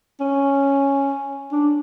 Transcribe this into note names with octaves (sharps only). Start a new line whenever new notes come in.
C#4
D4